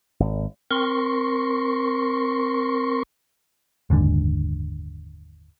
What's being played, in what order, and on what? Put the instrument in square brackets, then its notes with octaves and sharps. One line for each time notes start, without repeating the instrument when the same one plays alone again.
[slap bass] G#1
[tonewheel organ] C4 A#4 C6 C#6
[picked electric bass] F#1 D#2 G#2 D3